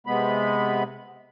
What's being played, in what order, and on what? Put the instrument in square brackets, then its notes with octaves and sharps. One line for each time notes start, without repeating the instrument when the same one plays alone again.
[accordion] C3 G#3 B3 B5